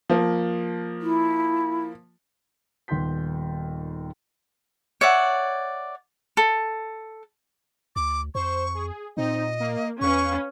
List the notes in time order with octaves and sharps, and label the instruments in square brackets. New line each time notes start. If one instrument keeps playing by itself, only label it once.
[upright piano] F3 A#3
[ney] E4
[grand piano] D#1 D#2 B3 C6 G6 B6
[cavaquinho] C#5 D5 E5 F#5
A4
[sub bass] D2 [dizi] D6
[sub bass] F2 [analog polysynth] C5 [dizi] C#6
[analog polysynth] G#4
[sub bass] A#2 [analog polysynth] C4 D#4 [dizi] D#5
[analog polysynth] A#3
[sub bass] E2 [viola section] C#4 [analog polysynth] B4 F5 [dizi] C#6